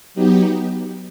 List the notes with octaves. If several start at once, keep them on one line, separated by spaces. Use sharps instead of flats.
F#3 B3 D#4 G4